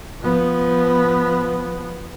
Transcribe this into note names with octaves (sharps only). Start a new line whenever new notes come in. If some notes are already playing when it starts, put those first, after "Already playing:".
F3 B3